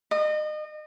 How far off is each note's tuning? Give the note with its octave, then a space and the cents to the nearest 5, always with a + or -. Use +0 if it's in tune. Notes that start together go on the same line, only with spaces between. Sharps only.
D#5 -30